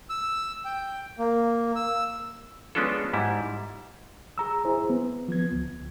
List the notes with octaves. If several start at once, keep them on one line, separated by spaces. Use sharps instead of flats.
E6
G5
A#3
E6
G#3 B3 C#4 D4 F4 A4
G#2 G3 E4
G#4 A#5 E6
E4 G#4 C5
B3
F3 B3 G#6
D2